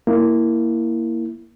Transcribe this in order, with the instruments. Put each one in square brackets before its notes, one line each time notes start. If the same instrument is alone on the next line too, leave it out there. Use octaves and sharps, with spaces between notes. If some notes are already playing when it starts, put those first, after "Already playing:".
[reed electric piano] A#3 E4